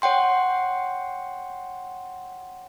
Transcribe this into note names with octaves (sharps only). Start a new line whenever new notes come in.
C#5 F#5 G5 C6